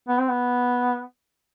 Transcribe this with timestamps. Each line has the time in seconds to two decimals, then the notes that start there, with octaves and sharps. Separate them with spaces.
0.08 B3
0.19 C4
0.29 B3